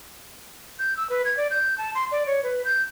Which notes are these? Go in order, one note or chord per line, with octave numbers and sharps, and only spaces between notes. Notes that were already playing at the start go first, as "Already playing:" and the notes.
G6
E6
B4
G#6
D5
G6
A5
C6
D5
C#5
B4
G6